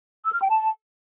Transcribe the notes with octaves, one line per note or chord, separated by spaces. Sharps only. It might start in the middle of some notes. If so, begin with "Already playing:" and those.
E6
F6
G5
A5